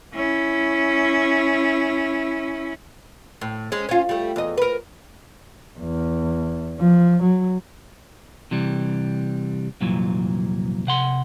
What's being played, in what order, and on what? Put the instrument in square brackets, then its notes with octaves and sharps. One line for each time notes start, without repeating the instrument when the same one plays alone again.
[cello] C#4 E4
[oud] A2
G#3 C#4
C#4 F4
G3 A3
E2 D#5
A#4 B4
[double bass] E2
F3
F#3
[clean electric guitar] C3 E3 G3
C2 F2 A#2 E3 F#3
C3 F#5 C6